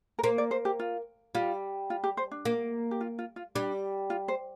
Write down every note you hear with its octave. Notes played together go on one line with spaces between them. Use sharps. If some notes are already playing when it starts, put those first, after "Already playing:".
A#4
A#3 C5
D5
C5
G4
F4
G3 F4
F4
G4
C5
D4
A#3
G4
F4
F4
F4
G3 D4
F4
C5